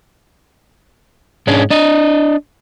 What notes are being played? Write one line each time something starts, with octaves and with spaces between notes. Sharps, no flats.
G#2 G#3 C#4 D4
D4 D#5